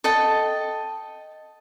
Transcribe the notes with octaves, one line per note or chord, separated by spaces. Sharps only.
A4 D#5 G5 A5